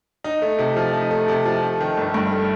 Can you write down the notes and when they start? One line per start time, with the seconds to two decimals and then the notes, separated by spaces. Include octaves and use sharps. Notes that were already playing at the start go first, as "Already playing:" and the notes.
0.24 D#4
0.42 A3
0.59 C3
0.76 F3
0.94 D#4
1.11 A3
1.28 C3
1.45 F3
1.62 A3
1.81 D#3
1.97 G1
2.14 G2
2.32 A3